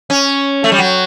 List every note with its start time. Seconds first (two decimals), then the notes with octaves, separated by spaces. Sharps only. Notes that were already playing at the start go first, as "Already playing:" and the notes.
0.10 C#4
0.64 A3
0.72 G3
0.79 F#3